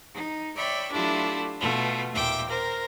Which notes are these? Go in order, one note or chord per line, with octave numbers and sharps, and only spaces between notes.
D#4
C#5 D5 E5 G5 B5
F#3 A3 D4 E4 F4 G4
B2 A3 F4
D#2 A#2 E5 G5 D6
A#4 C5